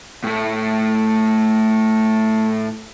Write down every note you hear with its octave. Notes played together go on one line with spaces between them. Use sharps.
A2 A3